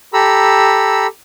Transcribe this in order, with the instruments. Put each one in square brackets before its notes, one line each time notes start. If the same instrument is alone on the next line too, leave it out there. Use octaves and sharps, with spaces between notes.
[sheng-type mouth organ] G4 A4 A#5 B5 E6